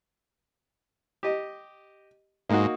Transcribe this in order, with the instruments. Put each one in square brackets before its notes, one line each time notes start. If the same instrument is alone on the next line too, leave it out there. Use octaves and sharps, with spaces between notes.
[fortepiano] G4 D#5
[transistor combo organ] G#2 [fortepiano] A#3 D#4 F#4